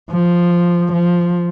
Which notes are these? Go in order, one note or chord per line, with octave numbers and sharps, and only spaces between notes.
F3
F3